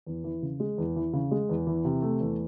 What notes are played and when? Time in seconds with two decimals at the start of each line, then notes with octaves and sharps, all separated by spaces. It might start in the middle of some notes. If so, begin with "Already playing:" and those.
0.06 E2
0.24 E3
0.42 C#3
0.60 G#3
0.78 E2
0.96 E3
1.13 C#3
1.31 G#3
1.49 E2
1.67 E3
1.85 C3
2.02 A3
2.20 E2